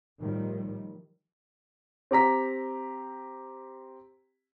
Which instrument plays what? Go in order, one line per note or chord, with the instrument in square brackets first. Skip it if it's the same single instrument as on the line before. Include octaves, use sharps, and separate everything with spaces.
[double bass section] A2 D#3 F3 G3
[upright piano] C4 G4 A#5 B6